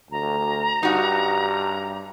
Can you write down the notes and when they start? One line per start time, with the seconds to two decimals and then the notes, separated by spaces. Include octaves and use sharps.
0.11 D2 A#5
0.83 G2 D#4 F#4